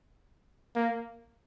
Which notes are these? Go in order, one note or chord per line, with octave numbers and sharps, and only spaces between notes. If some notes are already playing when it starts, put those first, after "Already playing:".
A#3